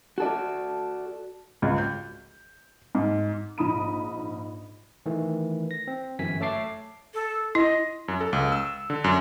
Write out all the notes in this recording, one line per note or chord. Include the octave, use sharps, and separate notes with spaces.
F#4 A4 D5
C#2
G6
G#2
A#1 G#2 A#5 B5 D#6 D#7
D#3 E3 A3
A#6
C4
G1 F#2 E3 G#5 B6
A3 C#5 E5 A5 D6 C7
A4
E4 D#5
F#2
A4
C#2
E6
D3
F#2